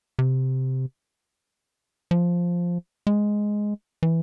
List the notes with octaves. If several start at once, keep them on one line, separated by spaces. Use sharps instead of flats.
C3
F3
G#3
E3